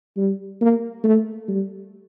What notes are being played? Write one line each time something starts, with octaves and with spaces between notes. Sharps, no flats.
G3
A#3
A3
G3